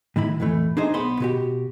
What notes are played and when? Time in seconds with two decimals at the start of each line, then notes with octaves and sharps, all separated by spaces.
0.16 A2 D#3 E4 B5
0.40 F2 A#2 E3 A3
0.77 D4 D#4 G#4 C5 D#5
0.94 B1 B3 C5 B5 C6
1.20 B2 F#4 G4